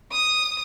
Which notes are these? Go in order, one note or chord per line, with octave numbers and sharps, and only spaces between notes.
D#6